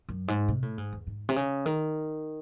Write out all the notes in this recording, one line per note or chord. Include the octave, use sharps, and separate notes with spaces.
F#2
G#2
C3
A2
G#2
E2
G#2
C3
C#3
D#3